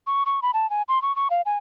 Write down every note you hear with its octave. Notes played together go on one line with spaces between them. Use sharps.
C#6
C#6
B5
A5
G#5
C6
C#6
C#6
F5
G#5